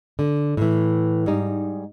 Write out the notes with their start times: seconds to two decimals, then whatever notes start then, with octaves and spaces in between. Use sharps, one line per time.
0.19 D3
0.57 A2 E3
1.26 G#2 G3 D#4